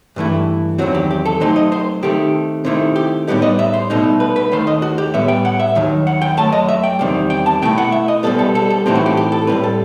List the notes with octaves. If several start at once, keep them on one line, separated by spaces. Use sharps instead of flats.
G2 E3 A3 E4
E2 D#3 F#3 C4 F#4
G4
G4
A4
C3 F#3 A3 D#4 C5
D#5
C5
C3 D#3 A3 G4
C3 D#3 A3 E4
G4
A2 G3 B3 D#4 G4
D#5
E5
C5
C2 B2 A3 D#4
B4
B4
D#2 D#3 A3 C5
D#5
F#4
G4
A2 G3 B3 E5
G5
F#5
E5
D#2 D#3 F#3
F#5
G5
F#2 F#3 A3 A5
D#5
E5
G5
E2 C3 D#3 G3
G5
A5
B2 A3 E4 G5
F#5
E5
D#5
C2 B2 G3 B3 A4
A4
A4
A4
A2 E3 A3 C4 D#4 G4
F#4
G4
G4
A4
A2 G3 C4 B4
A4